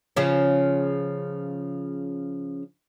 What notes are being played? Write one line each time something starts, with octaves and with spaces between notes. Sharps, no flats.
C#3 F3 C#4